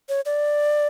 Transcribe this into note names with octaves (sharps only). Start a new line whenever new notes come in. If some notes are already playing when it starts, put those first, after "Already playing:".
C#5
D5